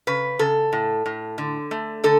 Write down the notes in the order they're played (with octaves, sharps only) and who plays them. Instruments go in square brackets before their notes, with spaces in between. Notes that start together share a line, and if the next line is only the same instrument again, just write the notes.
[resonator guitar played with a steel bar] C#3 B4
C#3 A4
A2
A2
D3
A3
D3 A4